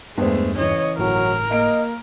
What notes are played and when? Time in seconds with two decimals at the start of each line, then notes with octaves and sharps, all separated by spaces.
0.18 E2 G2 G#3 A3 B3 C5
0.59 C#3 E3 C#5 D#5
0.98 G1 A2 F#3 A#4
1.51 A#3 D#5 D7